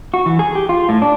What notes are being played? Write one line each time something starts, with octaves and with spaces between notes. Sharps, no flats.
F#4
E3
G#4
G4
F4
A2
D4